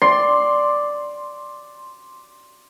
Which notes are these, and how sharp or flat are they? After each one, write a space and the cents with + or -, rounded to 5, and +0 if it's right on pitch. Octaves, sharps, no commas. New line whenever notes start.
D5 +0 C6 +0